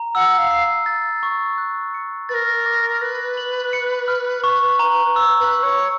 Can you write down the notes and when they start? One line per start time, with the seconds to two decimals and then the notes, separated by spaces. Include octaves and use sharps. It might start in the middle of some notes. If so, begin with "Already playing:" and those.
Already playing: A#5
0.15 F#5 E6
0.38 F5
0.51 C7
0.86 A6
1.23 C#6
1.58 F#6
1.94 C#7
2.29 B4 A6
2.34 A#4
2.66 D6
3.01 B4 A6
3.37 F#7
3.73 C#7
4.08 F6
4.44 C#6
4.79 A#5
5.16 E6
5.40 B4
5.52 A#5
5.63 C#5